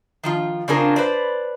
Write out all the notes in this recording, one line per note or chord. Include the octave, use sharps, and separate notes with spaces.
D#3 F3 F4
C#3 C4 D4 F4 G#4 A#4
B4 C5 D5